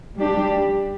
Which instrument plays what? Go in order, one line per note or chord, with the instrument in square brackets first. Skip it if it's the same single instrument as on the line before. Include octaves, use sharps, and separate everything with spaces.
[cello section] G3 D4 G4